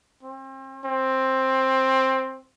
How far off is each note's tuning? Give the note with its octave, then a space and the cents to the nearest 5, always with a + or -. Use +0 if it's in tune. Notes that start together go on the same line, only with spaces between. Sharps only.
C4 +40
C4 +10